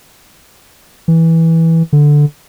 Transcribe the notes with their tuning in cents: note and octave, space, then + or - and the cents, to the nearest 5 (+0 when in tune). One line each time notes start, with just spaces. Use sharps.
E3 -10
D3 +0